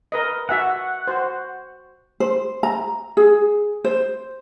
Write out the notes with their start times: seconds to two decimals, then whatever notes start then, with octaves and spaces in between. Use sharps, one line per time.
0.12 A#4 B4 D#5
0.49 F#4 E5 F#5 G#5
1.07 F#4 C5
2.20 C5
2.63 A#5
3.17 G#4
3.84 C5